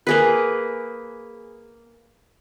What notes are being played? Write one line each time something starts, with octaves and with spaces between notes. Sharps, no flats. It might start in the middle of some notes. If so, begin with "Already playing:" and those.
A#3 G#4 B4